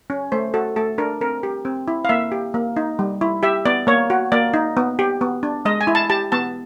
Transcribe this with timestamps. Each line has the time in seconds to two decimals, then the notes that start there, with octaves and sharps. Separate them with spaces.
0.10 C#4
0.32 A3 C5
0.54 F#4 A4
0.76 A3 A4
0.98 D4 A#4
1.21 C4 A#4
1.43 G4
1.65 C4
1.88 E4
2.05 F5
2.09 A#3 E5
2.32 G4
2.54 A#3
2.76 D#4
2.99 G3
3.21 E4
3.43 G4 E5
3.66 B3 D5
3.87 A#3 C#5
4.10 F#4
4.32 A#3 D5
4.54 D#4
4.77 B3
4.99 G4
5.21 B3
5.43 D4
5.65 G#3 D#5
5.81 G#5
5.87 E4
5.95 A5
6.10 G4 A5
6.32 B3 A5